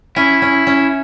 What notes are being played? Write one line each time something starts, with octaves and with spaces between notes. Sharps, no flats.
C#4 E4
C#4
C#4